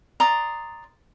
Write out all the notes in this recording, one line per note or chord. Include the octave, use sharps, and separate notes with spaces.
D5 A#5 C6 D#6